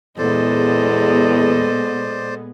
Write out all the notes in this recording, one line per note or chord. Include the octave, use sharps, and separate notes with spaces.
E2 A#2 G#3 B3 A4 C5 D5 D#5